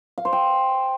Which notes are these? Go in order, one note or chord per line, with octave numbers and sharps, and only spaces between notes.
F5
C5
G5